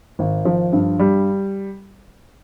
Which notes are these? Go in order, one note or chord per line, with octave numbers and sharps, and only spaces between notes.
G#1
F3
G2
G3